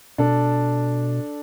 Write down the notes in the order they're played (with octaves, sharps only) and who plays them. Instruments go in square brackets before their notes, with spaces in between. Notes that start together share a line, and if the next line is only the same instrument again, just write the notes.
[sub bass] B2 [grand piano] D4 A4